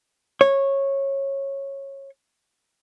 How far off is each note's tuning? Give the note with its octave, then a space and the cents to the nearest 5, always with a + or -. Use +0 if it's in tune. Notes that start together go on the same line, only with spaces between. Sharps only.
C#5 -15